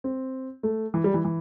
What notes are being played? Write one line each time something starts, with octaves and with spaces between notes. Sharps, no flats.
C4
A3
E3
G3
E3
E3